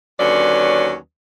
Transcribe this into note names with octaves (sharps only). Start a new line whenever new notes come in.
D#2 D3 F#3 C#4 B4 D5